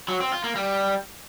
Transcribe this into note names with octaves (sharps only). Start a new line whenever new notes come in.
F#3
C4
F4
A#3
G3